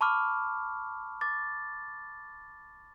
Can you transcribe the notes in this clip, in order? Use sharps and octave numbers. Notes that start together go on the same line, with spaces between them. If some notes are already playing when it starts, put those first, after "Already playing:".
A5 B5 C#6 D6 F6
D6 A6